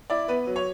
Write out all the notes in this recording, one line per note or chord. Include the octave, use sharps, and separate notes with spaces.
E4 D5
B3 B4
F#3
C#5